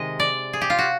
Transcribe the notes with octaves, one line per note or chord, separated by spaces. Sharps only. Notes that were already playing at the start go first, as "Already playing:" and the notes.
Already playing: C3 D#3 G#3 D#5
D5
G#4
G4
F4
F#4